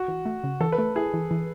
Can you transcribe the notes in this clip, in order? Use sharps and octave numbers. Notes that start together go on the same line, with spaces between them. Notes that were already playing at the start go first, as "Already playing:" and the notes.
Already playing: F#4
E3
A3
C#3
E3 A4
B4
A3
E4 G#4
E3
E3